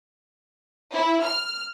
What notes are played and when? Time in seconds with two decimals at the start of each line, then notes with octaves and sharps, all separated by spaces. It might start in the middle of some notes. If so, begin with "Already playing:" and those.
0.93 E4
1.25 F6